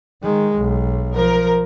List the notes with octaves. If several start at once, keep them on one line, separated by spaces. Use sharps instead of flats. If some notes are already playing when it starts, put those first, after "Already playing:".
D#3 G#3
B1
F3 A#4